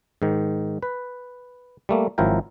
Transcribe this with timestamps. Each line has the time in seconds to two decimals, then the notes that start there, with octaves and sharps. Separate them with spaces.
0.22 G#2 D#3
0.83 B4
1.89 G3 A3 A#3
2.18 G#1 F3 F#3 E4 A#4 G5